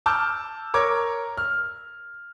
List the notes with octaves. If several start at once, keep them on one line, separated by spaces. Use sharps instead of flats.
A5 D6 E6 F6 G6
A#4 C#5 D6 G#6
F6